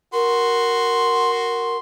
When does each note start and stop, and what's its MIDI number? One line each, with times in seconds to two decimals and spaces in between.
0.13 1.80 66
0.13 1.77 70
0.13 1.80 84